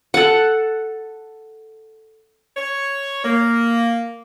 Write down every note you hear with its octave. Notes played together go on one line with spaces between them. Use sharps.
A4 F#5
C#5
A#3